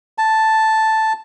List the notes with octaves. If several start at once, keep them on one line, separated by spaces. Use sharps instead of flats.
A5